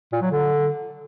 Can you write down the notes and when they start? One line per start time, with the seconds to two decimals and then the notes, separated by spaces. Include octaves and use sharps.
0.12 A#2
0.22 F#3
0.31 D3